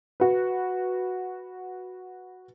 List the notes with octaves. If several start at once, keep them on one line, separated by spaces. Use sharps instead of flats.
F#4 B4